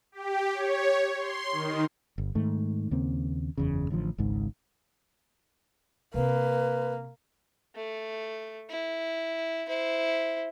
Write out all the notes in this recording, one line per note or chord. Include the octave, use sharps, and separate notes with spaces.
G4
C#5
C6
D#3
G1
G#2 D#3 A3
D#2 C#3 A#3 C4
F#1 E2 C#3
A1 D3 F3
G#1 C#2 G#2
C3 A#3 C4 B4
A3
E4
E4 C5